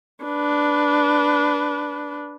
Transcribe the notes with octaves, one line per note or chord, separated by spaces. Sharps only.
D4 B4